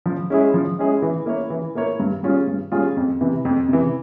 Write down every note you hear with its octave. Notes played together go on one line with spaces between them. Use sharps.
F3
G#3 C#4 E4 G#4
F3
G#3 C#4 E4 G#4
E3
A#3 E4 A#4 C#5
E3
A#3 E4 A#4 C#5
G2
G3 C#4 F4 G#4
G2
G3 C#4 F4 G#4
F2
C3 E3
F2
C3 E3